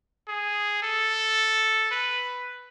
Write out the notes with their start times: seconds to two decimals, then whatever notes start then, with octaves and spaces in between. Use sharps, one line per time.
0.28 G#4
0.82 A4
1.91 B4